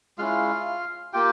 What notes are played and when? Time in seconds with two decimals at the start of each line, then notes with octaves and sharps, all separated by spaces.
0.18 G#3 C#4 E4 F4 F5
1.13 A#3 F4 G4 G5